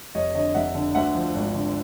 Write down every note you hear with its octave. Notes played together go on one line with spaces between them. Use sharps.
F1 C#5 D#5
D3 C#5 D#5
F1 E5 F#5
D3
D2 E5 F#5
F3
G#1
D3